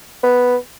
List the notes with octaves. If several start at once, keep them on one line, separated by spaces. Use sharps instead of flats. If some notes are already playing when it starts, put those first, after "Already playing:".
B3